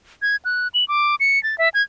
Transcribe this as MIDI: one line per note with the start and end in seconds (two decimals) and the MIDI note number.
0.22 0.36 92
0.45 0.68 90
0.74 0.85 102
0.88 1.15 86
1.20 1.41 97
1.43 1.58 93
1.58 1.69 76
1.74 1.82 92